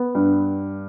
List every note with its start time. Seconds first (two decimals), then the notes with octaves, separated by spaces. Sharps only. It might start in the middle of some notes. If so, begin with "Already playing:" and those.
Already playing: B3
0.15 G2